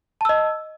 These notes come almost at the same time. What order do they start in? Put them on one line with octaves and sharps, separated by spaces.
A5 E6 D#5